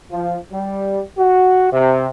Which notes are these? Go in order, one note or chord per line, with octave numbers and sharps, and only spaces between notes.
F3
G3
F#4
C3